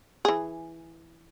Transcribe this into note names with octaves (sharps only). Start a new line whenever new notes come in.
E3 G#4